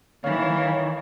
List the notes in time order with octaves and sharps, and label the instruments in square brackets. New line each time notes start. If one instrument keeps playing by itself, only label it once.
[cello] D#3 E3 [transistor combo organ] C#5 F5